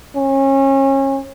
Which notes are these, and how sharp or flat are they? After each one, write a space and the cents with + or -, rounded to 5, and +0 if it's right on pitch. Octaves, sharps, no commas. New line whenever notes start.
C#4 -30